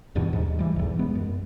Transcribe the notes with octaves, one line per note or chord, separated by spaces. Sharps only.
E2 G2 B2 E3
D#2 G#2
E3 G3
B1 E2
G#3 B3
F#2